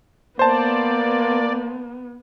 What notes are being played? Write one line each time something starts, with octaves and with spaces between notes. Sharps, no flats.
A#3 B3 C5 D5 A5